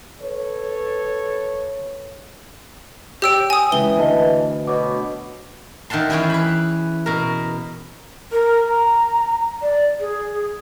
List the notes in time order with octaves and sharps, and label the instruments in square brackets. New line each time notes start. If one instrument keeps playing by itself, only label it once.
[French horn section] A4 B4 C#5
[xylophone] G4 E6 D7 [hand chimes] C#5 G5 G6
[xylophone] G#5 D#6
[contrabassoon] C#2 [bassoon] E3 [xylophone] G7
[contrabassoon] D2 [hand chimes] B4 D#5 A5
[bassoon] B2 [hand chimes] C#5 D6
[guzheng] D#3 E5 F#5 A5 C6
E3 C#4 E4 G#4 G5
B4 B5
B2 A#4
[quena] A#4
A#5
D5
G#4